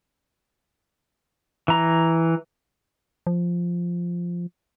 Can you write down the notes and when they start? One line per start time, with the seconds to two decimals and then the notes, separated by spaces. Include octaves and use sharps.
1.68 E3 A#5
3.27 F3